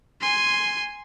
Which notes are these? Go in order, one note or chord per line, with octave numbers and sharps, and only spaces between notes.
G#5 C6